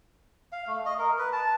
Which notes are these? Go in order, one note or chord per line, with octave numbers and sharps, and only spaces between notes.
F5
A3
D#5
A#4
B4
A5